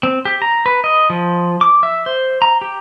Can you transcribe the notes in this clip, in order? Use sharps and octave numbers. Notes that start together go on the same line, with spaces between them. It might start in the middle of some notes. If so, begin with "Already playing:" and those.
C4
G4
A#5
B4
D#5
F3
D6
E5
C5
A#5
G4